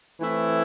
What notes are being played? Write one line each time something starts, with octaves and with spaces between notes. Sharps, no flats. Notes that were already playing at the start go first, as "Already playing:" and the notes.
E3 A3 C4 E4